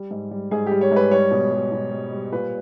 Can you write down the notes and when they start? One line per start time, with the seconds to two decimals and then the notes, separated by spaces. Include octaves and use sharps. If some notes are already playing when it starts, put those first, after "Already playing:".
Already playing: G3
0.11 G#2
0.31 G3
0.51 G#2 G#4
0.67 G3 G4
0.81 C#5
0.91 G#2 B4
1.11 G3 C#5
1.31 B2
1.52 G3
1.72 B2
1.92 G3
2.12 G3
2.32 A#2 B4